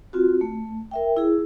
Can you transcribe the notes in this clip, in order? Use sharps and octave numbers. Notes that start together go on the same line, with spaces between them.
C4 F4 F#4
A3
A#4 E5 G5
E4 G#4